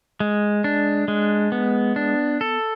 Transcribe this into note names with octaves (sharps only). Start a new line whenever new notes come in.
G#3
D4
G#3
B3
D4
A4